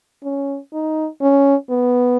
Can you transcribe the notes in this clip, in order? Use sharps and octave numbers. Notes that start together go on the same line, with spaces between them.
C#4
D#4
C#4
B3